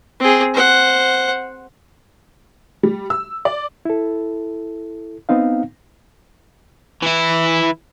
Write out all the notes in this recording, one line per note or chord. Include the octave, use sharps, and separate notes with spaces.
C4 G#4
C5 F#5
G3
E6
D5
E4 A4
B3 C4 D#4 F5
E3 E4